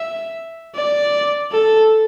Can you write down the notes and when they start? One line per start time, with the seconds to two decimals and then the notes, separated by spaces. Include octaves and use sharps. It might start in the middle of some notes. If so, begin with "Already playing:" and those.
Already playing: E5
0.75 D5
1.52 A4